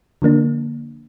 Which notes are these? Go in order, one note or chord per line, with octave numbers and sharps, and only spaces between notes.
D3 F3 A#3 D4